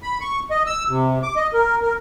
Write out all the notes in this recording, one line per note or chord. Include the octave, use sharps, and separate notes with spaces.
B5
C#6
D#5
E6
C3
D6
D#5
A#4
A#4